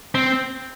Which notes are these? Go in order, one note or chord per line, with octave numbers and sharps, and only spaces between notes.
C4